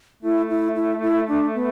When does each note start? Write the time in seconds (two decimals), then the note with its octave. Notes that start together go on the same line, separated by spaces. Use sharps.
0.23 A3 E4
0.50 E4
0.76 E4
1.02 E4
1.28 D4
1.54 B3